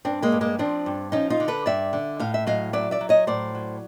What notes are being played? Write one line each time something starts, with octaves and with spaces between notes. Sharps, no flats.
G2 C4 D4
G#3 A#3
G2
G#3 A#3
F3 C4 D4
G2
F3 C#4 D#4
D#4 F4
D3
A4 B4
G2 D5 E5
D3
A2 F5
E5
F#3 D#5 F5
F#3 D5 E5
D5 E5
F#3
C#5 D#5
A2 C5 D5
F#3